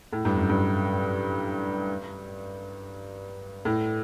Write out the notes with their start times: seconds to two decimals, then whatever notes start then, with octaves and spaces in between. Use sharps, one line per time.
0.13 A2
0.25 G2
0.37 F#2
0.49 G2
3.65 A2